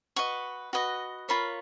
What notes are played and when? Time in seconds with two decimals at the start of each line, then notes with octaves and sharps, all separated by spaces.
0.16 F#4 B4 D#5 C#6
0.73 F#4 B4 D#5
1.29 F4 A#4 C#5 B5